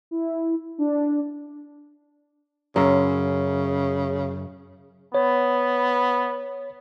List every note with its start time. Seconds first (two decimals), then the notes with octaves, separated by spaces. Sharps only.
0.11 E4
0.78 D4
2.76 F#2 C#3
5.14 B3 C#5